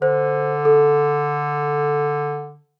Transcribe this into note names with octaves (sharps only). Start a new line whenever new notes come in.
D3 C5
A4